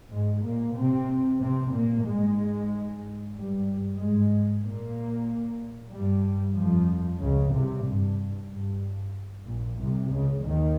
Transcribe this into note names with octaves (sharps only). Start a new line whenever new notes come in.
G#2 G#3
A#2 A#3
C3 C4
C3 C4
A#2 A#3
G#2 G#3
G2 G3
G#2 G#3
A#2 A#3
G2 G3
F2 F3
C#2 C#3
C2 C3
G2
G2
A#1 A#2
C2 C3
C#2 C#3
D#2 D#3